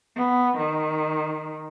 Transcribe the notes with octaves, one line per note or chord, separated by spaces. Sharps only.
B3
D#3